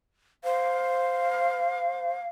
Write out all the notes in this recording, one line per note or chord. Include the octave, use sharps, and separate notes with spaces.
C5 F5